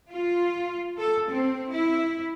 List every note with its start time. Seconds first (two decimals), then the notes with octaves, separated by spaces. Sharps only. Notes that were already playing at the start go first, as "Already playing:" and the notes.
0.11 F4
0.98 A4
1.29 C4
1.72 E4